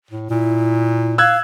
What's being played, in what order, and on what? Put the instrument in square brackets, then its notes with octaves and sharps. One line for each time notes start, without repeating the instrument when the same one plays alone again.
[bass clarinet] A2
[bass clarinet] A#2 [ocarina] E4
[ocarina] F5 [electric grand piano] E6 F#6 G#6